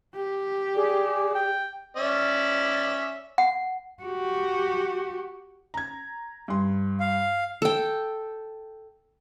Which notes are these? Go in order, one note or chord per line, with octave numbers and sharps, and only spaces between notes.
G4
G#4 D5
G5
C#4 D5 E5
F#5
F#4 G4
A#5 G#6
G2 C6
F5
A4 G5